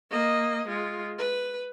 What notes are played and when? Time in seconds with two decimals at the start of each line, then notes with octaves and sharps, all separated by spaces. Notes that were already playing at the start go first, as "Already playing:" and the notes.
0.11 A#3 D#5
0.68 G#3 F4
1.18 B4